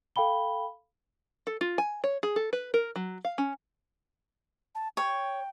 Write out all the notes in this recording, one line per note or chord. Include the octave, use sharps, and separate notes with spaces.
A4 F5 G5 B5 G7
A4
F4
G#5
C#5
G#4
A4
B4
A#4
F#3
F5
C#4
A5
C#5 G5